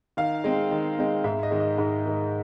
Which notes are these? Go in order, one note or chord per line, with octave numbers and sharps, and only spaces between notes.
D#3 F5
G#3 C4
D#3
G#3 C4
G#2 E5
D#5
D#3 G#3
D#5
G#2 D#5
D#3 G#3